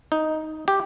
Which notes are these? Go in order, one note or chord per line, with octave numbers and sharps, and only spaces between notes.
D#4
G4